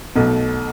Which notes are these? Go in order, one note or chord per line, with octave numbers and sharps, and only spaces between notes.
B1 B2 A3